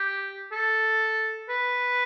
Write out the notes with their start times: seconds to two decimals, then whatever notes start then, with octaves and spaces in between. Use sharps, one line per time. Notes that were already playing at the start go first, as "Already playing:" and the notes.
Already playing: G4
0.52 A4
1.49 B4